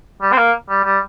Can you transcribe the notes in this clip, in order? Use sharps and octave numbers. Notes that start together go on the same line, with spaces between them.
G3
C4
A#3
G3
G3